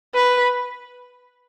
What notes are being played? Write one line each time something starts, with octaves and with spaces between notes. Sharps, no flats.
B4